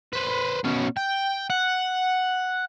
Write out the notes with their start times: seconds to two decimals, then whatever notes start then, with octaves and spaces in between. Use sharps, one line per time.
0.13 B4 C5
0.64 B2 C#4
0.97 G5
1.50 F#5